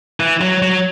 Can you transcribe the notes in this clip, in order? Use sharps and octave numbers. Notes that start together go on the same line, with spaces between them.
E3
F#3
F#3